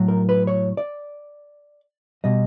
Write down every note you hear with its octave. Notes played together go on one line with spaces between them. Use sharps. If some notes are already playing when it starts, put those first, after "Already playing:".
Already playing: A2 F#3
A#4
B4
C#5
D5
B2 G3 D#5